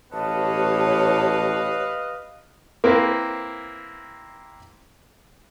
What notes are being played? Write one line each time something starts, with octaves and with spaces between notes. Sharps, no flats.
A1 G4 B4 C#5 D#5 F5 A5
A#3 C4 E4 B4